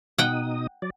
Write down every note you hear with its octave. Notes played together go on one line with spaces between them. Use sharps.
B2 D#4 F#5 G5 D#6
F#3 D5